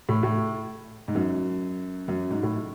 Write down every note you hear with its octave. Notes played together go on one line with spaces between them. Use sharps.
A2
A2
G#2
F#2
F#2
G#2
A2